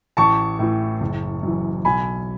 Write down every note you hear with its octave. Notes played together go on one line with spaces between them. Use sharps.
A1 A5 C#6
A2 E3
F#1
F#2 E3
B1 G#5 B5